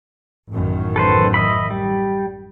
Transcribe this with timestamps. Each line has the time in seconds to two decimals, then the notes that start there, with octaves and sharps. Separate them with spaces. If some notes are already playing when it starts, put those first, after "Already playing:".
0.51 A1 F#2 D#3
0.96 A4 B4 C5
1.34 D#5 E5 B5
1.70 G3